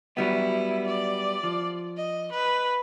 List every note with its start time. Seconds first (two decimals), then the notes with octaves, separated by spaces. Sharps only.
0.17 F#3 G3 B3 E4
0.87 D5
1.44 F3
1.97 D#5
2.32 B4